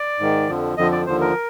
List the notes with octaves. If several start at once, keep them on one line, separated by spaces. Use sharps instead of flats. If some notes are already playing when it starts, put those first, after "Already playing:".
Already playing: D5
G#2 D#3
F2 D3 F3
F2 D3 F3 D#5
D5
D#2 D3 F3 C5
A#4